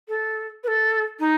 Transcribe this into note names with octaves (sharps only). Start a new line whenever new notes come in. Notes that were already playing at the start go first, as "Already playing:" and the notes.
A4
B4
A4
D#4